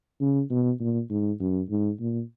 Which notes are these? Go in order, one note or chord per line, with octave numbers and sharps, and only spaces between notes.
C#3
B2
A#2
G#2
F#2
G#2
A#2